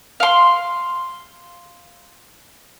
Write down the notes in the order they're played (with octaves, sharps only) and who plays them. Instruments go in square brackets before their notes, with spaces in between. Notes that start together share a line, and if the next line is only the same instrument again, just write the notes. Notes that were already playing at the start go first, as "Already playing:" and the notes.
[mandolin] F5 C6